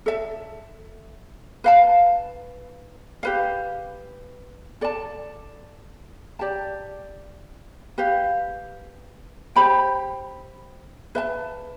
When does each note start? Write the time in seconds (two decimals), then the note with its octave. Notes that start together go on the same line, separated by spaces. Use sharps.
0.06 A4 E5 A5
1.64 B4 F5 A5
3.23 G4 B4 F5
4.81 A4 D5 A5
6.39 G4 D5 A5
7.98 G4 B4 F5
9.56 G4 C5 G5 B5
11.15 B4 E5 A5